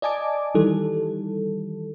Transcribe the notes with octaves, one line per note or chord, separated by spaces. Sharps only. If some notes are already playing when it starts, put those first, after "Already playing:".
D5 D#5 G#5 A5 D6
D#3 E3 G3 A4